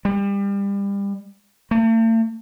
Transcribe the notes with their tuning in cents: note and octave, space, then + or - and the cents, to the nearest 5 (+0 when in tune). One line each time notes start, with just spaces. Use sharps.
G3 +30
A3 +45